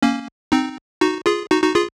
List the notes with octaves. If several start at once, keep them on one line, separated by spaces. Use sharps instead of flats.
A#3 C#4
C4 D#4
D#4 F#4
F4 G#4
D#4 F#4
D#4 F#4
F4 G#4